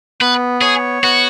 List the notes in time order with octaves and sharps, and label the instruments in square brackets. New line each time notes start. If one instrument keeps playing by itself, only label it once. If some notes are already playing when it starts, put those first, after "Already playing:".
[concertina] B3 [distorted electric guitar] B4
[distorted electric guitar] G#4 [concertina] C#5
[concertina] B3 [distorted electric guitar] F#4